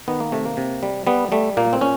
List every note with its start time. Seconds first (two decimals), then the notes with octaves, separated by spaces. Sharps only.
0.08 D#3 B3
0.20 A#3
0.32 C3 A3
0.45 A#3
0.57 C3
0.83 G3
1.07 G3 B3
1.32 G3 A3
1.57 A#2 A#3
1.73 C4
1.81 A#2 C#4